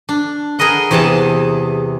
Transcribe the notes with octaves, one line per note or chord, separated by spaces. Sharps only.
D4
G#4 A#4 B4 D#5 F#5
E2 C3 E3 G#4 A5